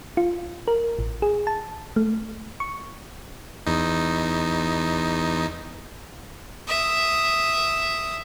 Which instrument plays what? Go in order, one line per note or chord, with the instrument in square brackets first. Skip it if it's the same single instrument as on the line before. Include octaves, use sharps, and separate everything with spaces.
[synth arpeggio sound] F4
A#4
A1
G#4
A5
A3
C#6
[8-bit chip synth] E2 D#4
[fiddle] E5 D#6